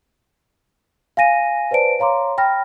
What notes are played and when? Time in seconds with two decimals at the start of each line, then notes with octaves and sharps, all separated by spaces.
1.17 F5 G#5 A#6 D#7
1.71 B4 C5 D5 A5 D7
1.99 C#5 F5 A#5 C6 D6
2.38 G5 B5 F6 A#6